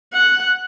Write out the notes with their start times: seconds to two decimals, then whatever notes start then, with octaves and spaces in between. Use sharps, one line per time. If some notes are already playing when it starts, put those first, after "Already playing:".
0.13 F#5